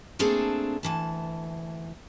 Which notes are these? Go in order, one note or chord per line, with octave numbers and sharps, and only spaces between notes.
A3 A#3 C4 D4 G#4 A4
D2 E3 A5